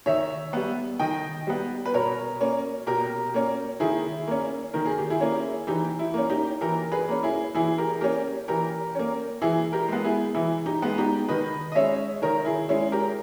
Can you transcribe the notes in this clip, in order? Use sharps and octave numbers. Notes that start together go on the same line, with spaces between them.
D#3 C#5 E5
G3 B3
D#3 D#5 G5
G3 B3
B4
B2 A#4 C#5
A#3 C#4
B2 G4 A#4
A#3 C#4
D#3 E4 G#4
A#3 C#4
D#3 A#4
G#4
G4
E4 G#4
A#3 C#4
E3 D#4 G4
E4
A#3 C#4
D#4 G4
E3 G4 A#4
G#4 B4
A#3 C#4
E4 G#4
E3 E4 G#4
G4 A#4
A#3 C#4 G4 A#4
E3 G4 A#4
A#3 C#4
E3 E4 G#4
G4 A#4
G#3 B3
E4 G#4
E3 E4
D#4 G4
G#3 B3
D#4 G4
D#3 B4 D#5
D#5
G#3 C#4 C#5 E5
D#3 A#4 C#5
E4 G#4
G#3 C#4 E4
G4 A#4